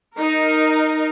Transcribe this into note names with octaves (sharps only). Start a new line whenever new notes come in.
D#4 A#4